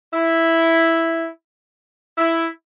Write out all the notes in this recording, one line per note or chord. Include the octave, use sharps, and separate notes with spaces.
E4
E4